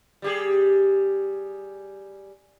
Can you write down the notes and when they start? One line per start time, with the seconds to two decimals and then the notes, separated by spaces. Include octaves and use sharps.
0.22 G3 G4 G#4